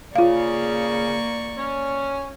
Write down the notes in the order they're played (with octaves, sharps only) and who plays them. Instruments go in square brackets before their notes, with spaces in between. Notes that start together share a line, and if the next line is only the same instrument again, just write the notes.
[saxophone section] C#3 [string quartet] A#3 D5 C#6 [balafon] F4 F5
[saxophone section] C#4